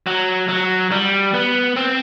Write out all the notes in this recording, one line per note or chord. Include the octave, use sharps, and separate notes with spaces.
F#3
F#3
G3
B3
C4